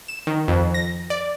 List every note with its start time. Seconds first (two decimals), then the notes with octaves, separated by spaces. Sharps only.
0.08 E7
0.27 D#3
0.48 F2
0.74 A#6
1.10 D5